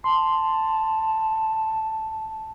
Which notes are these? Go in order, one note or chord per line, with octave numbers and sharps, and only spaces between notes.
A5 C6